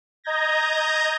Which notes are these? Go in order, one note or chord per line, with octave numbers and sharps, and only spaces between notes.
D#5 A#5 G6 G#6 A#6